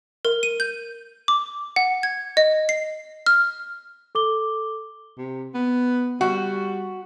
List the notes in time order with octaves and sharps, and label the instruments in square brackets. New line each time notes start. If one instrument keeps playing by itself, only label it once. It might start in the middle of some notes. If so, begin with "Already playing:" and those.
[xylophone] A#4
D#7
G6
D6
F#5
G#6
D#5
C7
F6
[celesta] A4 D6 G7
[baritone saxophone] C3
B3
[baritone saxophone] G3 [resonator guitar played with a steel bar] F#4